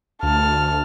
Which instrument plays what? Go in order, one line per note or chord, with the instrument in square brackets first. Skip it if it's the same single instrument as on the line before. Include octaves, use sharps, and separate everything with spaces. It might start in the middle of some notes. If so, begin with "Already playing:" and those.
[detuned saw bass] D2 [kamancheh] A5 F6